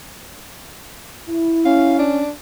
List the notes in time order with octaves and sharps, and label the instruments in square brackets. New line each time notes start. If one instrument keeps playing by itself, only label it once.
[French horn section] E4
[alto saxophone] C#4 [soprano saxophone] F5
[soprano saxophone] D4